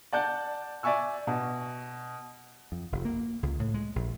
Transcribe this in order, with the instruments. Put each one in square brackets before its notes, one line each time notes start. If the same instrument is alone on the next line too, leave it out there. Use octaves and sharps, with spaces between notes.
[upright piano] D5 F#5 A5 G6
D5 E5 G#5 C#6 E6
B2
[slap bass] F2
F1
A#3
C#2
A2
G#3
A#1